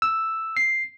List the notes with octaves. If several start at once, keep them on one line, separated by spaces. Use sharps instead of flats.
E6
C7